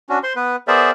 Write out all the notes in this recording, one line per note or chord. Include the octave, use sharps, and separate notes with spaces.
C#4 D4 F#4
C5 C6
B3 B4
B3 G#4 A#4 C5 D5 E5